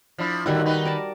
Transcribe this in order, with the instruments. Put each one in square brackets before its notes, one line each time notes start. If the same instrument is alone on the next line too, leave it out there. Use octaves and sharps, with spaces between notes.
[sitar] F3 D4 E4
[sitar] A2 D3 E4 [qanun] D#3 G3 F#4
[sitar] D#4 B4
[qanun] A#4 D5 A5